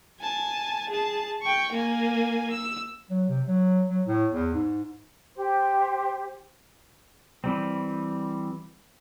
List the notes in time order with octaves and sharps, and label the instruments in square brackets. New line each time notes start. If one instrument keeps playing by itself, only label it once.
[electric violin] G#5 A5
G#4 A5
G5 C#6
A#3 G#5
E6
[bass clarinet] F#3
C3
F#3
F#3
A2
E2
G#2
[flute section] G4 C5
[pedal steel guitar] E3 G3 C4